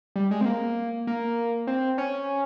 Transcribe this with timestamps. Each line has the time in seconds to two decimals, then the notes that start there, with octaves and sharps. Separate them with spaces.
0.16 G3
0.31 G#3
0.41 C4
0.45 A#3
1.07 A#3
1.67 C4
1.98 C#4